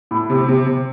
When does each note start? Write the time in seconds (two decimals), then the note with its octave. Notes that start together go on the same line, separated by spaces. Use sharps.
0.11 A2
0.30 C3
0.49 C3
0.66 C3